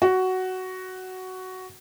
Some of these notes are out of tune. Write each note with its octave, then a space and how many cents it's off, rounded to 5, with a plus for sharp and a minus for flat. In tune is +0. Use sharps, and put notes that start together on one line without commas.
F#4 +10